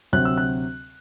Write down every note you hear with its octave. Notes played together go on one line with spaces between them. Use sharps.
D2 C3 F#3 C4 F#6
E6
F#6